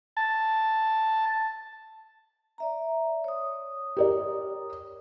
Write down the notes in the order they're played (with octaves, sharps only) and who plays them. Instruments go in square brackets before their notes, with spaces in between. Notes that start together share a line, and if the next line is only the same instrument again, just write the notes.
[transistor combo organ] A5
[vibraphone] D5 E5 A#5
C#5 D#6
[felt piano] G4 A#4 D5